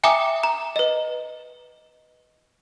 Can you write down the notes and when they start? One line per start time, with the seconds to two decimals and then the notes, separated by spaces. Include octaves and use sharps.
0.04 E5 G5 G#5 A#5 D6 D#6
0.43 A#5
0.76 B4 D#5